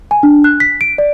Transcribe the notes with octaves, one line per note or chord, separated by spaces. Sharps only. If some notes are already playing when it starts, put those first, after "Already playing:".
G#5
D4
F#6
B6
D7
D5